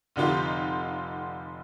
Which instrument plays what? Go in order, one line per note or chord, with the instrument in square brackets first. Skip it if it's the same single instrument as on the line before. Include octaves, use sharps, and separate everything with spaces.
[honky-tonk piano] F1 D3 D#4 F4 G4